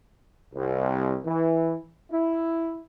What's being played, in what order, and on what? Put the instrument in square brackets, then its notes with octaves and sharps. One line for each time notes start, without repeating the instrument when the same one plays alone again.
[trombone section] C2
E3
E4